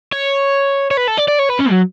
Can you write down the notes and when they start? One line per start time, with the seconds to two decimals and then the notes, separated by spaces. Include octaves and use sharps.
0.13 C#5
0.91 C#5
0.97 B4
1.08 A4
1.18 D5
1.28 D5
1.39 C#5
1.50 B4
1.60 C#4
1.71 F#3